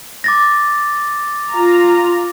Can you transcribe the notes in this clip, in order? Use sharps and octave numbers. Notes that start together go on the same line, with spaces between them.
D6 A6 A#6
F4 A#5